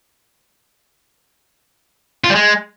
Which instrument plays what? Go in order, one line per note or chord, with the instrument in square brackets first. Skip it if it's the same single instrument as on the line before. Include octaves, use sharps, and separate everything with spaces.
[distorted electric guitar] F4
G3
G#3